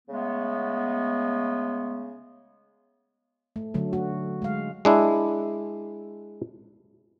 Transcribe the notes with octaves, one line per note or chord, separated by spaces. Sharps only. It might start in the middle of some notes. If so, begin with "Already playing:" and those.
C#3 G#3 A3 B3
A3
D3 F#3 A3
A3 F#4
G#3 F5
G#3 D4 E4